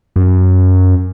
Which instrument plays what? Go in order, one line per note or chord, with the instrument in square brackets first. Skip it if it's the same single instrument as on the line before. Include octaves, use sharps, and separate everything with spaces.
[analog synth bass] F#2